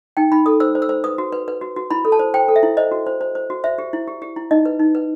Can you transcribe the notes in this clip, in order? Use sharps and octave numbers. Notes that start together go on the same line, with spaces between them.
D#4 G5
D#4 B5
A4 D#6
C5 E6
C5
E6
C5
B4 D#6
F#4
B4
B4
F#4
F#4
E4 B5
A4
A5
C5
C5 G5
A4
E5
E4
C5 D#5
F#4
C5
C5
C5
F#4
C5 E5
G4
E4
G4
G4
E4
D#4 D#5
B4
D#4
B4